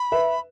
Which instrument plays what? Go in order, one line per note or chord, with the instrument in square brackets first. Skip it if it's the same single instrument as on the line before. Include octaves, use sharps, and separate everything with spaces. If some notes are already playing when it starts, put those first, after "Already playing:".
Already playing: [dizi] B5
[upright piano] B4 E5